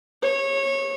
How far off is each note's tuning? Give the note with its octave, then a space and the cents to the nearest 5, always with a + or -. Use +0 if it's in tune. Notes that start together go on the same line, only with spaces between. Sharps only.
C#5 -20